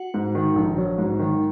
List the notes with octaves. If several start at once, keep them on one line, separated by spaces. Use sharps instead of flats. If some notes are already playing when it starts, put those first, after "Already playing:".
Already playing: F#4 F#5
G#2
D#3
A#1
F#3
G#2
D#3